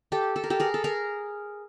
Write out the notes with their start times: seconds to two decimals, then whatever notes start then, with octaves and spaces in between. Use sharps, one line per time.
0.12 G4 A4
0.36 A4
0.44 A#4
0.50 G4 A4
0.60 G#4 A#4
0.74 A4
0.84 G#4 A#4